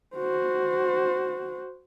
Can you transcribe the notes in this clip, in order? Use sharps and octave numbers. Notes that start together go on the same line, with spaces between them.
F#4 C5